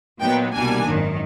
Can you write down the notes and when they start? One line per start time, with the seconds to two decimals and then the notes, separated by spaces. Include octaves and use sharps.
0.21 A#2 F#3 B3 D#4 G5
0.53 C2 B2 G3 A#3 D4 G#5
0.85 G#1 F#2 D#3